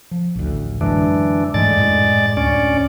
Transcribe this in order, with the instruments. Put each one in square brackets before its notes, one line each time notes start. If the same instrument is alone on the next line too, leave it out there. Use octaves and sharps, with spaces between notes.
[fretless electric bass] F3
A1 D2
[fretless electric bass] F#2 D3 G#3 [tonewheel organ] E3 D4
[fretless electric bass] G#2 E3 A3 [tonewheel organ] G#3 D5 A6
[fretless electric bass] F#2 A2
[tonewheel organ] D2 C#4 D5